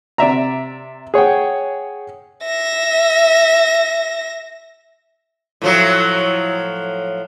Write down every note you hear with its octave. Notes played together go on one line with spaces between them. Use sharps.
C3 D5 E5 A#5
G#4 C#5 F#5 G5
E5 A#6
A2 F3 F#3